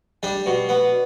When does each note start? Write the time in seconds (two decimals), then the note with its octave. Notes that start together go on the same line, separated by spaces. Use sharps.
0.23 G3 D4
0.46 B2
0.69 B3